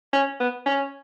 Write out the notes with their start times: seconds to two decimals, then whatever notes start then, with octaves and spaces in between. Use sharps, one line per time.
0.13 C#4
0.40 B3
0.66 C#4